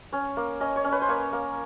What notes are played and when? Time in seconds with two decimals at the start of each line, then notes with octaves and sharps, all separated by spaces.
0.13 C#4 C#5
0.37 A#3
0.60 C#4 D#5
0.76 C#5
0.84 C#4
0.92 B4
1.02 C5
1.09 A#3 C#5
1.33 A#3